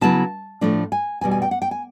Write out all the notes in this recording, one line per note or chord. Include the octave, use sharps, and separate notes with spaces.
C#3 F#3 B3 E4 A5
A2 F3 A3 D4
G#5
E2 B2 G3 G#5
G#5
G5
F#5
G5
G#5